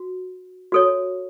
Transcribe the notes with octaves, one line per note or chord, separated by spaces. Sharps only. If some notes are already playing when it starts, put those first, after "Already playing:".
Already playing: F#4
F#4 A4 C#5